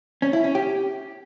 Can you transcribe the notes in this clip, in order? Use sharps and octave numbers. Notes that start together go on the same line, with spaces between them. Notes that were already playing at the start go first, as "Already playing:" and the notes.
C#4
E4
C#4
G4